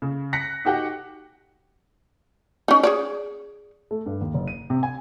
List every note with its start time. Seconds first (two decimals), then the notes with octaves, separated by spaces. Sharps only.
0.02 C#3
0.33 F#6 A#6 B6 C#7
0.65 D#4 F#4 G4 F#5 G5
2.68 C#4 D#4
2.83 G#4 C#5 D5
3.91 A3
4.06 G2
4.21 D#2
4.34 F#1
4.48 D#7
4.70 C3
4.83 G#5